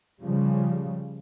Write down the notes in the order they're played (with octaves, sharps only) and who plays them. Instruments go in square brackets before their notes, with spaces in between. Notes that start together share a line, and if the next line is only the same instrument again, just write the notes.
[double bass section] C#3 F3 G3